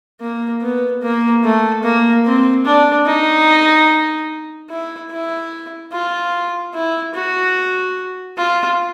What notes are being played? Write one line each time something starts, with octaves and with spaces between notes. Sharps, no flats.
A#3
B3
A#3
A3
A#3
C4
D4
D#4
E4
E4
F4
E4
F#4
F4